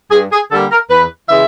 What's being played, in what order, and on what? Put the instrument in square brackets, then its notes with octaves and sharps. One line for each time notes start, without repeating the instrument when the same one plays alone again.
[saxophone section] G2 G#4
G#4
D3 G3 A#3 A4
A#4
E2 B4
C#3 E3 G#3 E5